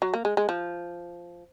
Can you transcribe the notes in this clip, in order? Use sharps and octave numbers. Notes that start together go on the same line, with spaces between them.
F#3
A#3
G#3
G#3
F3